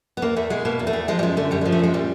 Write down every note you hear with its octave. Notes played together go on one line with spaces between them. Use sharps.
B3
E2 A#3
E2 A3
B2 G#3
B2 A#3
E2
A3
E2
F3 G#3
G3
F#2 G#3
D3 A3
F#2 G3
F3 G#3
A3
F#2 G#3
A#2 G3